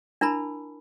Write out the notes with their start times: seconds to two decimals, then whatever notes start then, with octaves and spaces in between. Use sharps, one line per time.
0.21 D4 E4 A#4 A5 B5